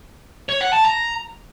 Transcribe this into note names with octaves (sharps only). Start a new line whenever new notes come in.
C#5
F#5
A5
A#5